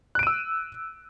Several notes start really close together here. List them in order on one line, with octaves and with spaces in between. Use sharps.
F#6 D7 D#7 E6